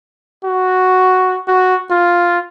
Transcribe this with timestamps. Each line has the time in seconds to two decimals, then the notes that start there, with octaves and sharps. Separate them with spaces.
0.45 F#4
1.48 F#4
1.91 F4